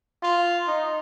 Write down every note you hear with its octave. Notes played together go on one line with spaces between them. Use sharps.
F4
D#4